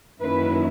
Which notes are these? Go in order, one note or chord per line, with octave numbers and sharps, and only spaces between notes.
F#2 D#3 A#3 C#4 E4 B4